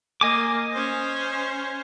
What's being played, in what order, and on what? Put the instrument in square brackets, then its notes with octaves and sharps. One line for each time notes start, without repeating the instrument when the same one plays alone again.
[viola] A#3 [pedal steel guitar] D#5 G#5 D6
[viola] C#4 C5